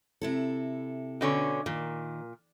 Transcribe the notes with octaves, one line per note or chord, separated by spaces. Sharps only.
C3 E4 A4
B2 D3 C#4
A#2 D#3